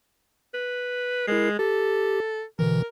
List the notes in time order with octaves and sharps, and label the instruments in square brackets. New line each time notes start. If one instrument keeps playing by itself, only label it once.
[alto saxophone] B4
[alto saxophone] G#3 [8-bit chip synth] E4 A#4 C7
[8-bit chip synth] G4 [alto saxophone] A4
[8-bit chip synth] B2 D3 E3 [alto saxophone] A#4